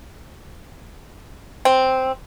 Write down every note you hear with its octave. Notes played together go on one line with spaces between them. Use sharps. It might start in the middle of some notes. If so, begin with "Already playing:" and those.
C4